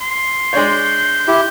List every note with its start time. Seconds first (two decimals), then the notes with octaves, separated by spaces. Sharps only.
0.01 C6
0.53 G#3 D4 C#5 G6
1.28 E4 G4